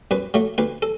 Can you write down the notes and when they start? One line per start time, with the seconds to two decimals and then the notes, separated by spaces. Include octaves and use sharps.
0.11 F#2 B4
0.34 F#3 A3
0.58 D2 B4
0.82 A4